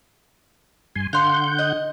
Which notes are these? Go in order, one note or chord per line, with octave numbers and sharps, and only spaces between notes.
G2 G#5 C6
D3 F5 F#5 C6 G6
D#5